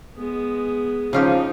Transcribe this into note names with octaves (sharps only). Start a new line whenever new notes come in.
G#3 B3
C#3 F3 D#4 F4 G4